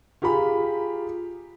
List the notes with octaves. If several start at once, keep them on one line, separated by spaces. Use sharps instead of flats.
F4 G4 G#4 A#5 B5